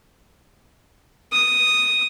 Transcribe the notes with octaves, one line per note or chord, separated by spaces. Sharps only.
D#6